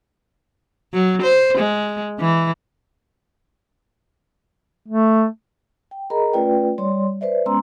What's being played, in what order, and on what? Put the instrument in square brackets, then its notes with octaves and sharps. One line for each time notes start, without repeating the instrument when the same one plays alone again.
[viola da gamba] F#3
C5
G#3
E3
[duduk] A3
[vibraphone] G5
G#4 A#4 D#5 A#5 B5
A3 C#4 F4 B4 D5 G5
G3 C#5 D5 C6
B4 C5 D5 E5
G#3 B3 C#4 A#5 C6 E6